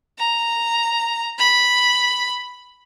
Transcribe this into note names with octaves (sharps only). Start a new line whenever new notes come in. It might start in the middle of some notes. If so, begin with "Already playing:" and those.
A#5
B5